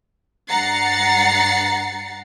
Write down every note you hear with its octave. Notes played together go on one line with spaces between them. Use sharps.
G2 F#5 A#5 A6 C7 C#7